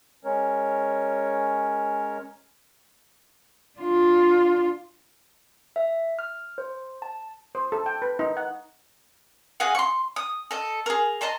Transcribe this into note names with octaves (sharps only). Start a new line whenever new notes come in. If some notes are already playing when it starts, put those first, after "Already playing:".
G#3 C#4 A#4 C#5
D4 F4
E5
F6
C5
A5
C5
A4
G5
B4
D#4
F#5
G#4 D#5 F5 F#5
C6 C#6
D#6
A4 D#5
G#4 A#4
D#5 A5 A#5 C6